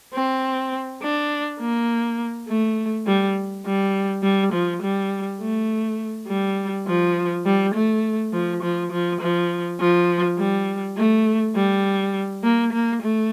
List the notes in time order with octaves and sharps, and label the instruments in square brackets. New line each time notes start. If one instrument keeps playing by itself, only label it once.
[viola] C4
D4
A#3
A3
G3
G3
G3
F3
G3
A3
G3
F3
G3
A3
F3
F3
F3
F3
F3
G3
A3
G3
A#3
A#3
A3